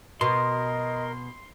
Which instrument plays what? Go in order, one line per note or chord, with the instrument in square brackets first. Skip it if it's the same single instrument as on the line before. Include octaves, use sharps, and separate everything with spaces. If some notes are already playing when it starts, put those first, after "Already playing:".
[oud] B2 [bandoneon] A#4 [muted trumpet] D#5 [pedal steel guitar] C6